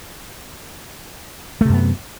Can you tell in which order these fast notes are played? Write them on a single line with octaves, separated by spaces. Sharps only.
A3 C3 F#2 B3